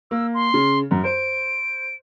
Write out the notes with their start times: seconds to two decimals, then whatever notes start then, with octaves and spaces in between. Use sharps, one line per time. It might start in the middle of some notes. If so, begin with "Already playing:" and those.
0.11 A#3 E6
0.34 C6
0.54 C#3
0.91 F#2
1.04 C5 D7